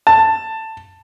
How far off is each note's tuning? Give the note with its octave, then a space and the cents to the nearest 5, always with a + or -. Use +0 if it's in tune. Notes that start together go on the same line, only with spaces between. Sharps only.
A5 +10